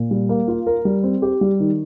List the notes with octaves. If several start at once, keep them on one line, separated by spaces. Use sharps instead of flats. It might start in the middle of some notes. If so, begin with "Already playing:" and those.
Already playing: A#2
G3
A#3
F4
A#4
G3
C4
G4
G3
D#3